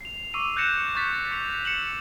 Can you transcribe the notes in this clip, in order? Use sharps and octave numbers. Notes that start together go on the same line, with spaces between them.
C7 F7
C#6 D6 E6 C7 D#7 F7
F#6 G6 A6 A#6 C#7 E7
C#6 G6 A6 B6
C#6 B6 C#7 F7
E6 C#7 E7 F#7